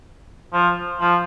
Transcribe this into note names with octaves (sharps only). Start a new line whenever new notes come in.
F3
F3